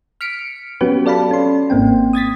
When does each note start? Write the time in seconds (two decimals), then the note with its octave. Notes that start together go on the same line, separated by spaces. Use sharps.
0.21 F6 B6 C#7 D7
0.81 F#3 B3 C#4 F#4 G4 B4
1.06 A4 D5 F5 A5 B5
1.31 C#4 C6
1.70 G#1 G#2 A#3 C4 G5
2.13 D#6 G#6 A6 B6